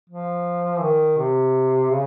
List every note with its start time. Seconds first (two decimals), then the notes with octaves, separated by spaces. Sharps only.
0.09 F3
0.78 E3
0.82 D#3
1.18 C3
1.91 C#3